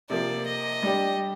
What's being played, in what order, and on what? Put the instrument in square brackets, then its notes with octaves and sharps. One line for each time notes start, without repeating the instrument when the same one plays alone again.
[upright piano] C3 F3 A#3 [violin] D5
[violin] D#5
[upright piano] G3 D4 G4 D5